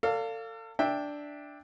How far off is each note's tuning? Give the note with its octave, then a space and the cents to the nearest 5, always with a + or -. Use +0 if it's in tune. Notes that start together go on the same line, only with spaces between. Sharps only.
A4 +35 D5 -30 F5 +0
D4 +0 E5 -5 G5 +15